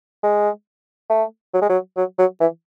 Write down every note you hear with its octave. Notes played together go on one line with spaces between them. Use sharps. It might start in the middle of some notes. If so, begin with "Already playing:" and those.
G#3
A3
F#3
G#3
F#3
F#3
F#3
E3